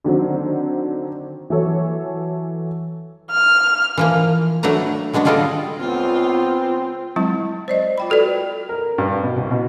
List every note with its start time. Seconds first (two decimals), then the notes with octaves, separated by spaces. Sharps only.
0.04 D3 D#3 F#3 C4
1.50 E3 F#3 A4 C#5
3.31 F6
3.97 E3 F3 A#3
4.63 F#3 A3 D4 B4 A#5
5.13 F#3 G#3 B3 D4 F#4
5.25 G3 G#3 F4 A4 D5 D#5
5.80 C#2 B3 C4 F4
7.16 F#3 G#3 C4 E4
7.68 C5 D5 D#5
7.98 F4 G5 B5
8.10 F#4 A4 B4 D5
8.69 A#4
8.98 G2
9.23 B2
9.36 C2
9.51 B2